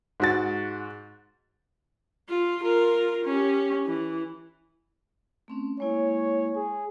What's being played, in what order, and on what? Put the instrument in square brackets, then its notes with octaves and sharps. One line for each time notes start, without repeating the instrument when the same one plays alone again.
[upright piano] G#2 F#4 A6
[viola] F4
F4 A#4
C#4 G4
E3
[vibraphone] A3 C4 C#4
[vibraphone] G#3 A#3 E4 [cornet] C#5
[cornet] G#4